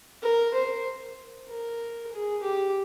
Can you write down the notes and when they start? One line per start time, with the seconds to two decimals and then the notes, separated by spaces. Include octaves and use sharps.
0.22 A#4
0.54 C5
1.49 A#4
2.12 G#4
2.43 G4